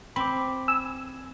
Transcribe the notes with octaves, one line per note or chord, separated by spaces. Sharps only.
C4 B5 D6
G#5 E6